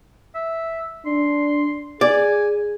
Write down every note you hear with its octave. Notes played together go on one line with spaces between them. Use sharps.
E5
D4 C6
G#4 D5 G#5